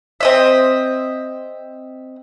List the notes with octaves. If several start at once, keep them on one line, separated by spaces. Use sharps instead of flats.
C4 D#5 E5